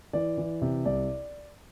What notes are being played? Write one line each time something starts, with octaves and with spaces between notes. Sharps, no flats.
E3 D5
E3
C3
C2 D5